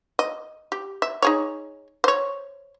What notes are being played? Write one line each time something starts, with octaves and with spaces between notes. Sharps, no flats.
D#5
G4
E5
D#4 G#4 C#5
C5 C#5